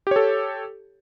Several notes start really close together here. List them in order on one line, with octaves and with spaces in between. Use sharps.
G4 C#5 A4